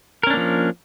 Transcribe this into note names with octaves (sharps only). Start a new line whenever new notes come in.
F3 A#3 C#4 D4 A#4